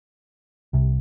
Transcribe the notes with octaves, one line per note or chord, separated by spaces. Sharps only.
C2 C3